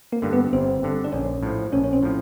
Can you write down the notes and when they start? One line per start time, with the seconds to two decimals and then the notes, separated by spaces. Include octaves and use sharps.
0.12 A#3
0.22 G2 D3
0.33 B3
0.53 G1 C4
0.83 G2 D3
1.04 D4
1.12 A#1 C#4
1.43 A2 F3
1.72 A#1 C#4
1.84 C#4
1.93 C4
2.03 A2 F3